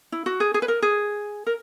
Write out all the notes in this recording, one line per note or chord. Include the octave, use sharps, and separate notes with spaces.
E4
F#4
G#4
G#4
B4
A#4
G#4
A#4